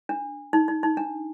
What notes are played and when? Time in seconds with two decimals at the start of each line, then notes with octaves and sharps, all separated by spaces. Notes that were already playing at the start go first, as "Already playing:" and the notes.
0.09 D4
0.53 D#4
0.68 D#4
0.83 D#4
0.97 D4